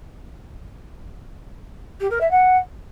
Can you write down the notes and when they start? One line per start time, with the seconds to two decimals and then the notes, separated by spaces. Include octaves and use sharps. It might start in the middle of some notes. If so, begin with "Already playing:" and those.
2.00 G4
2.10 A#4
2.20 E5
2.31 F#5